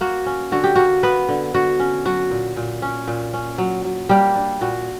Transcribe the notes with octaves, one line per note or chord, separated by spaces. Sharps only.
A#3 F#4
C#4
D3 F#4
G4
A#3 F#4
A#3 B3 B4
D3
D3 F#4
C#4
F#3 F#4
A#2
A#2
C#4
A#2
C#4
F#3
F#3
G3 A#3 G4
D4
A#2 F#4